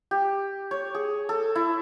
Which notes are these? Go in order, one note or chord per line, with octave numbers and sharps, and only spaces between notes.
G4
C#5
G#4
A4
E4